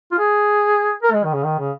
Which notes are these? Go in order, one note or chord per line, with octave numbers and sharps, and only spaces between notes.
F4
G#4
A#4
G#3
D#3
C#3
D#3
C#3